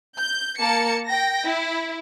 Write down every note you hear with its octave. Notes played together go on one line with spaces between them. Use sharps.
G6
A#3 A5 C#7
G5 A#6
E4